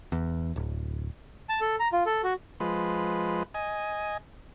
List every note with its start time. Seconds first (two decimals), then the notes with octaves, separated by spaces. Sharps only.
0.12 E2
0.56 D1
1.49 A5
1.61 A4
1.80 A#5
1.92 F4
2.06 A4
2.24 F#4
2.60 F3 G#3 B4
3.54 D#5 G#5